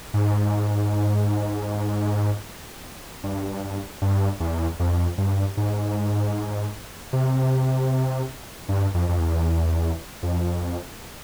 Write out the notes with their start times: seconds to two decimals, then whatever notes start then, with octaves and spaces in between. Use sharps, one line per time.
0.14 G#2
3.24 G2
4.02 G2
4.40 E2
4.80 F2
5.18 G2
5.57 G#2
7.13 C3
8.69 G2
8.94 F2
9.09 F2
9.19 E2
10.23 F2